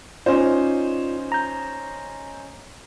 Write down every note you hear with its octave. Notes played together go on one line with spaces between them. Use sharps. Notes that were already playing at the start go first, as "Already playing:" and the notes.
C#4 D#4 F4 C5 D5
A#5 G6